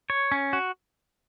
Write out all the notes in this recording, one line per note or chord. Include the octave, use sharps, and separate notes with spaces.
C#5
C#4
F#4